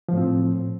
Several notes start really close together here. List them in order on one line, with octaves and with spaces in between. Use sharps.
F3 A2 C4